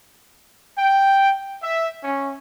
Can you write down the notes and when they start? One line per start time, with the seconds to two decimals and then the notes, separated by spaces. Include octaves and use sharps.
0.78 G5
1.62 E5
2.04 C#4